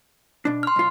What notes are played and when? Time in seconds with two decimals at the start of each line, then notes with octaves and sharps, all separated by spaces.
0.45 B2 D4
0.63 C6 F6
0.76 B1 F4